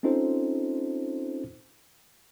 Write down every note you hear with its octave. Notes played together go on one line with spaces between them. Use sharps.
C4 C#4 D#4 F4 A4 C5